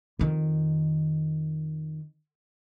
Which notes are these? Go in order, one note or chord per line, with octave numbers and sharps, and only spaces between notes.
F2 D#3